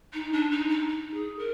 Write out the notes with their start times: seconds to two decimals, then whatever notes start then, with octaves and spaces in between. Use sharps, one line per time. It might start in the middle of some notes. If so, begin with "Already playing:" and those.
0.13 D#4
0.32 D4
0.51 D#4
0.69 D#4
0.88 D#4
1.13 G#4
1.38 A#4